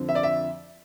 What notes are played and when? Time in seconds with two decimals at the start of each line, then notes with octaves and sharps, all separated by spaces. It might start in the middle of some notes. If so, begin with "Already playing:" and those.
Already playing: F2 D3 F3 C4
0.09 E5
0.15 D5
0.23 E5